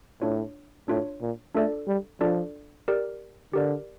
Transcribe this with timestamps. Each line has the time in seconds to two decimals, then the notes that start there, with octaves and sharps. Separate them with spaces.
0.22 A2 D4 F4 C#5
0.88 A2 D4 F4 C#5
1.21 A#2
1.55 A3 D4 F4 A4 D5
1.87 G3
2.21 F3 D4 F4 A4 D5
2.88 G4 A#4 D5
3.53 D3 G4 A#4 D5